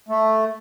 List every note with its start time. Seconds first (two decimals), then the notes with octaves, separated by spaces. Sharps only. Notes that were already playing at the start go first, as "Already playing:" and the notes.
0.09 A3